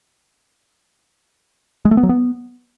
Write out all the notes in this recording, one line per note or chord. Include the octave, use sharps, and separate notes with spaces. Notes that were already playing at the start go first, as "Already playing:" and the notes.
G#3
A3
B3
F#3
B3